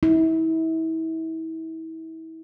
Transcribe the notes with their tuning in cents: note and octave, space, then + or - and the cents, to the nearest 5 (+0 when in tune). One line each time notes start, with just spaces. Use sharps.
E4 -35